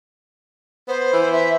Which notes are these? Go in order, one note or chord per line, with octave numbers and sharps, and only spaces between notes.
B3 C5
E3
E5